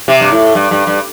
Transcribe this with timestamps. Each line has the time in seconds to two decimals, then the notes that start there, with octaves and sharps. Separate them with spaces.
0.08 C3
0.20 G2
0.32 A2
0.55 G2
0.71 G2
0.87 G2